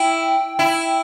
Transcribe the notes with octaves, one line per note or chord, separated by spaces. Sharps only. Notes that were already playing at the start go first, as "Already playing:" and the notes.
Already playing: E4 G5
E4